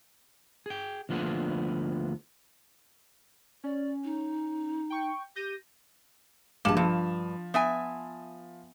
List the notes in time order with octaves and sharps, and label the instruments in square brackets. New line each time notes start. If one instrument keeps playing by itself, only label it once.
[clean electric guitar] G#4 G5
D2 F3 A#3 B3 D4 G#4
[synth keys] C#4 [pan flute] D5
[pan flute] D#4
[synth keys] G5 C#6
[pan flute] G4 [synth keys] G6 A#6 D#7
[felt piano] A#1 G2 E7 [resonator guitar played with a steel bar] A#3 A5
[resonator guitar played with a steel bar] G2 [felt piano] F3
[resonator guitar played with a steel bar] B3 E5 G#5